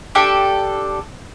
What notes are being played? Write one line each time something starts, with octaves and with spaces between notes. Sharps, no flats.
D4 G4 A4